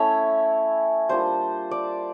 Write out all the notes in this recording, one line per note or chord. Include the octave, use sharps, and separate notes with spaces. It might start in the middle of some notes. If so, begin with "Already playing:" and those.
Already playing: A3 C#4 E4 C#5
G3 A#3 D4 F4 C5
D5